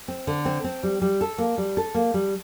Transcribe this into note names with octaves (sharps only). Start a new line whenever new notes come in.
C4
D3
C4
C4
G3
G3
A4
A#3
G3
A4
A#3
G3